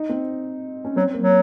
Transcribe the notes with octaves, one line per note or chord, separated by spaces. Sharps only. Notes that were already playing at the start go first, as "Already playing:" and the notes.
Already playing: D#4
C4
C#4
F#3 C4
A#3
F#3